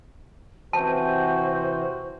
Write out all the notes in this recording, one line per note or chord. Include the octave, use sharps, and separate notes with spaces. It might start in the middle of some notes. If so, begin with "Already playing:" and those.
C3 E3 F#4 C5 A5